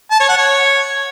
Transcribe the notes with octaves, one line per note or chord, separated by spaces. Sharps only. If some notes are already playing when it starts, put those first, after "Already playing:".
A5
C#5
F#5
C#5